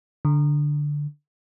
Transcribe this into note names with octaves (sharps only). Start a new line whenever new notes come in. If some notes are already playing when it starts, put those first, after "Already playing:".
D3